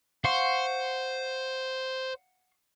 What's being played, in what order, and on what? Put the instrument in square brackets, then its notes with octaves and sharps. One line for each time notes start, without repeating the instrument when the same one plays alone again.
[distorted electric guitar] C5 [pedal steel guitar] F5 F#5 C#6